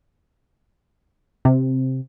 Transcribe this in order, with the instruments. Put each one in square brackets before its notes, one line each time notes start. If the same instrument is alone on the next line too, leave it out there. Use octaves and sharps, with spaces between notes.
[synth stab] C3